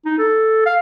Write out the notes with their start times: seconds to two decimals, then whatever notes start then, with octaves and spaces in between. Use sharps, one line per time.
0.05 D#4
0.18 A4
0.66 F5